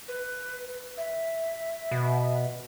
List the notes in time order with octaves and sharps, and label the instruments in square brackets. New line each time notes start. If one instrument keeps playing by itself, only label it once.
[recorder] B4
E5
[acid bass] B2